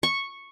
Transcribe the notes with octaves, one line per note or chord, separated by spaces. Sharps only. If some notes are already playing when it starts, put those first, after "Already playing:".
C#6